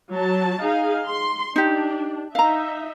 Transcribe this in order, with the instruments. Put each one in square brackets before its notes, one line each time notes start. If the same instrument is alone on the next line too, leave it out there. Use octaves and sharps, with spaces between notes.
[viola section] F#3 A5
D#4 G#4 F5
C6
[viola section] D4 [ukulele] D#4 G4
[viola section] D#4 E5 [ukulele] F5 A#5